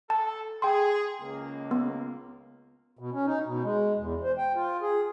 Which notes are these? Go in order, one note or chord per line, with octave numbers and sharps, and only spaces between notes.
A4 A5
G#4 G5 C6
C#2 A#3
B3
B2
C#4
D#4
B2
G#3
E2
C5
G5
F4
G#4